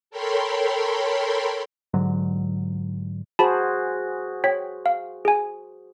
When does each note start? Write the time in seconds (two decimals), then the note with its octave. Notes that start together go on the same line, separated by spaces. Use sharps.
0.11 A4 A#4 C#5 G5 B5 C6
1.94 G#2 D3 F#3
3.39 F#4 G#4 C5 A5 B5
4.44 C#5 G5 B6
4.86 F5
5.25 G#4 G#5